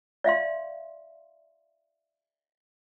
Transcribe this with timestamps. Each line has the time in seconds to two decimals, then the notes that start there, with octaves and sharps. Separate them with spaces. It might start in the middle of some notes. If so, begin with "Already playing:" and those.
0.24 D5 E5 F5 C6